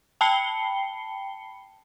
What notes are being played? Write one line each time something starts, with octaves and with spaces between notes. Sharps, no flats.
G5 A5 B5 C7 C#7 G7